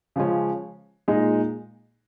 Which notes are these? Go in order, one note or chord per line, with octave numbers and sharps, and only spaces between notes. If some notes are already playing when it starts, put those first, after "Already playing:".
C#3 F3 G#3 C#4
A#2 G#3 D#4 G#4